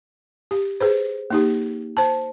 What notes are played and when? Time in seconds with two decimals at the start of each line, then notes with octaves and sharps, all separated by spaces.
0.51 G4
0.80 G#4 B4 C5
1.30 A#3 D#4 G4
1.97 C5 A5